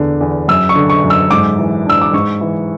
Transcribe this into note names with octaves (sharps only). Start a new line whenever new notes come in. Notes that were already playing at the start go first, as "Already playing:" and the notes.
Already playing: E2 D3 B3
E2
F#2 E6
C#6
D3
C#6
F#2
E6
G#2 D6
E3
D4 E6
D6
G#2 C#6
E3